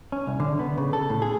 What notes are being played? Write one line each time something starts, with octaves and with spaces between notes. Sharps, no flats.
C#4
C2
D3
B3
C#3
A4
A2
G#4